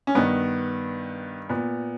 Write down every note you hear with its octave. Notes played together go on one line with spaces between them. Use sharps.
C#4
G2 D#3 B3
A#2 B3